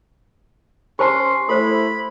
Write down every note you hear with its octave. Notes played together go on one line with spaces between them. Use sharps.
C#4 G4 C5 A5 C6 C#6
A3 E4 A4 C5 B5